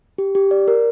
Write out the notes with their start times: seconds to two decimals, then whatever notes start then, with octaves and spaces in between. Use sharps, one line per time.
0.18 G4
0.35 G4
0.51 D5
0.68 A#4